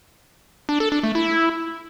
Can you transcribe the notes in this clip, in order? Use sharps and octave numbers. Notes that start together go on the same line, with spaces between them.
D4
A4
D4
A3
E4